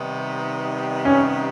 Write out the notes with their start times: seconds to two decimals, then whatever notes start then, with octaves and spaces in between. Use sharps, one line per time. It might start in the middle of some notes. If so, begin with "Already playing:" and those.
Already playing: C3 D#3 G3 B3 D#4
1.05 C#4